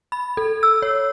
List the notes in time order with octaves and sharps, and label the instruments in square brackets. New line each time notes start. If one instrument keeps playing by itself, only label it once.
[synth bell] B5
A4
E6
C#5